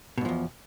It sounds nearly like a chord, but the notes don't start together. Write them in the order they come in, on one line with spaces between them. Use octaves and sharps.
B2 G#2 F3 E2